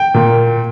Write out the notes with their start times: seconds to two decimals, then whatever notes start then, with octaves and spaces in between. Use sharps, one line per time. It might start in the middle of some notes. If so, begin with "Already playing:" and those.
Already playing: G5
0.14 A#2